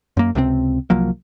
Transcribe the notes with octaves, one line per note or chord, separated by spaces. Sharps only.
F#2 A#3
C#2 C3 F3 C4
C2 F3 F#3 A#3